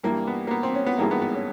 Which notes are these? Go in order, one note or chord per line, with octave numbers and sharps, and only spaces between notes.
G2 E3 G3 A#3
B3
A#3
B3
C4
C#4
B3
G#1 G2 E3 G#3 A#3
B3
B3
C#4